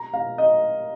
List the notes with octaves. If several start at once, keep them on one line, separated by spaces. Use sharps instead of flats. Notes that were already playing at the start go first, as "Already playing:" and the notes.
Already playing: A#5
F5
D#5